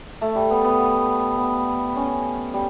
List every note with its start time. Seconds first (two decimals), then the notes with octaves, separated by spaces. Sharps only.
0.21 A3
0.35 G3
0.51 B3
0.64 B3
1.38 B3
1.96 C#4
2.54 G3